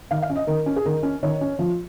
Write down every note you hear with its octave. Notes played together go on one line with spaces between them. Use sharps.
D#3 F5
F5
C#4
D#5
D#3 A#4
C#4
G#4
D#3 A#4
C#4
D#3 C#5
C#4
F3